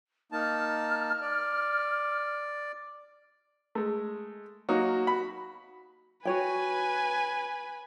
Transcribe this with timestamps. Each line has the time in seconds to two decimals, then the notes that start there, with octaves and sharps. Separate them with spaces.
0.32 A#3 D#4 A5 F6
1.21 D5
3.75 G#3 A3
4.69 F#3 A#3 D#4 F#4
5.07 B5
6.25 F#4 B4 C#5 G5 G#5